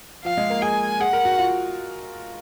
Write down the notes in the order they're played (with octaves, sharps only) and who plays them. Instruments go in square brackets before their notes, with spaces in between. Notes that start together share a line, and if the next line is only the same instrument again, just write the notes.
[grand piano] F3 [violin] F5
[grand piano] G#3
A#3
[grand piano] G#4 [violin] G#5
[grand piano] G#4 [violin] F#5
[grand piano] A#4
F#4
F4